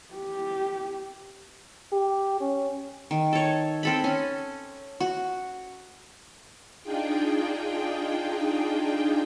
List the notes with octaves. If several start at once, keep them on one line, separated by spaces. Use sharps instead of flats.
G4
G4
C#4
D#3
A4 C#5
C4 A4 B5
C#4
F#4
D4 D#4 F4 G#4 G5